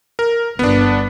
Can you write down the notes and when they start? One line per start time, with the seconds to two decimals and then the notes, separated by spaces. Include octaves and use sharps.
0.19 A#4
0.59 G1 B3 D4